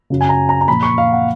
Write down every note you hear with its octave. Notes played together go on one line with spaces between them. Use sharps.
F#2 C#3 F#3
G#5
A#5
A#5
A#5
A#2 F3 B5
C#6
F5
F#5